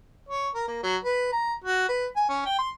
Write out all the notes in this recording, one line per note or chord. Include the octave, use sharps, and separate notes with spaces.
C#5
A#4
A#3
F#3
B4
A#5
F#4
B4
G#5
C#4
G5
C6